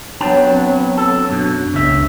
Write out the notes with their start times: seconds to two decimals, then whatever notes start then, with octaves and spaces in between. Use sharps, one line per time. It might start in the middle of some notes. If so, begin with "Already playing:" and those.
0.20 F#3 B3 D4 C#5 G5 A5
0.49 C4
0.97 A4
1.30 F#2 B2 D4
1.73 F#1 C#2 C#3 E5